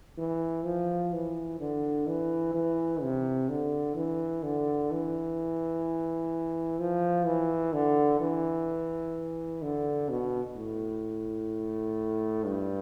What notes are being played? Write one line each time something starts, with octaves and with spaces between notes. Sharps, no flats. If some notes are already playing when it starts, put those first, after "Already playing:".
E3
F3
E3
D3
E3
E3
C3
D3
E3
D3
E3
F3
E3
D3
E3
D3
B2
A2
G2